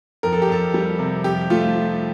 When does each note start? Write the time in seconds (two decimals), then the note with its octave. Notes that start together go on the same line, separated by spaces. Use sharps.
0.23 F2 A#4
0.33 A4
0.42 G4
0.48 F2 A4
0.74 G3
0.99 C3
1.24 F2 G4
1.50 A3 F4
1.75 F3